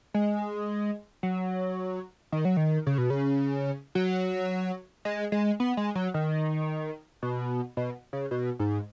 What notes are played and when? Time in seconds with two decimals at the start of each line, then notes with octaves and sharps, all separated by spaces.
0.14 G#3
1.23 F#3
2.32 D#3
2.45 F#3
2.57 D#3
2.86 C#3
2.98 B2
3.10 C#3
3.95 F#3
5.05 G#3
5.32 G#3
5.60 B3
5.77 G#3
5.95 F#3
6.14 D#3
7.22 B2
7.77 B2
8.13 C#3
8.31 B2
8.59 G#2